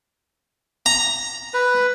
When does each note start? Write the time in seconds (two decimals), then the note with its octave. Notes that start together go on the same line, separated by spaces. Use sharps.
0.86 A#5
1.54 B4